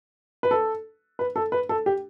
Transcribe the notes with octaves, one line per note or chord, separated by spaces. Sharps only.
B4
A4
B4
A4
B4
A4
G4